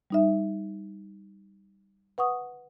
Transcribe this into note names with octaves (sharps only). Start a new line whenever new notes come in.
G3 D#4 E5
B4 F#5 C#6 D#6